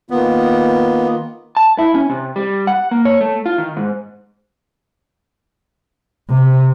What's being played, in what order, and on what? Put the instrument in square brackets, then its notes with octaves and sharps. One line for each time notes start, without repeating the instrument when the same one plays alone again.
[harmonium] D#3 A#3 F4 [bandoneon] B3
[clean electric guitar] A5
E4
C#4
C3
G3
F#5
A#3
C#5
A3
F4
D#3
G#2
[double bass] C3